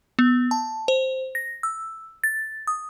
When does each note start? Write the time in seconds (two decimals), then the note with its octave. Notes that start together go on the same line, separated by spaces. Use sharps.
0.19 B3
0.51 A5
0.88 C5
1.35 A#6
1.63 E6
2.24 A6
2.67 D#6